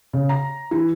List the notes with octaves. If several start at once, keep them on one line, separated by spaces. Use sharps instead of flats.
C#3
A#5
E3